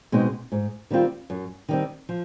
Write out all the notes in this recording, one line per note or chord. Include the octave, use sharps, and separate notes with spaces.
B2 G#3 C4 D#4
G#2
D#3 G3 C4 F4
F#2
D#3 G3 C4
F3